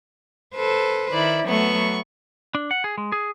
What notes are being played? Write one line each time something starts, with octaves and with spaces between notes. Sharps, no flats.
A4 B4 C5
D#3 E4 D5
F#3 A3 B3 C#6
D4
F#5
G#4
G#3
G#4